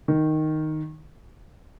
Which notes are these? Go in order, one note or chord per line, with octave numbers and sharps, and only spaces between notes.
D#3